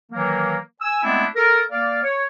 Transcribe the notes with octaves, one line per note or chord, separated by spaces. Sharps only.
D#3 E3 F#3 A#3
G#5 E6
G#3 A3 B3 C4 D4 E4
A4 A#4
A#3 D5 F5
C#5